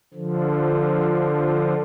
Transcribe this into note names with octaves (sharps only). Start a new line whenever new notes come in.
D3 F3